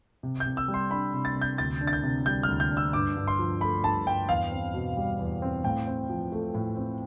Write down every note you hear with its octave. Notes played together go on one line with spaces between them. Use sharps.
C3
G6
C3
E6
G3
C6
D4 B5
C3
A6
C3
G6
D2 A6
D4
A6
G6
C3
G3 G6
D2 F6
G6
D4
E6
G2 D6
G2
C6
F3
A3 B5
G2 A5
G2 G5
E2 F5
C4
B2
G3
E2
C4
A2 G5
C4
F3
A3
A2
C4